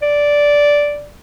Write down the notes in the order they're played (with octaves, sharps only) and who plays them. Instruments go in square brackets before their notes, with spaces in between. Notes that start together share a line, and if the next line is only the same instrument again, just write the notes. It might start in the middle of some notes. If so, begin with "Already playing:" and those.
[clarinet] D5